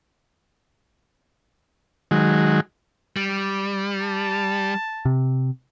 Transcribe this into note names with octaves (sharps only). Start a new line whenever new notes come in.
D#3 F#3 G#3
G3
A5
C3